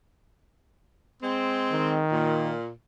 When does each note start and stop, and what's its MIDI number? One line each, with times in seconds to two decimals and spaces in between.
1.22 2.01 56
1.22 2.01 60
1.72 2.53 51
2.11 2.70 46